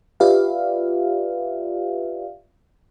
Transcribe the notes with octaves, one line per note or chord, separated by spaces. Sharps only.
F4 G4 B4 D5 E5 F5